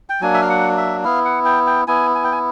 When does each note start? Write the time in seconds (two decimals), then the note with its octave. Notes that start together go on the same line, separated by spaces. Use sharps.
0.09 G5
0.21 F#3 A#3 D4 G#5
0.34 E5
0.42 F5
0.50 F#5
0.77 E5
1.04 B3 E4 F5
1.25 F#5
1.45 G5
1.67 G5
1.87 B3 E4 G#5
2.15 G#5
2.24 G5
2.32 G#5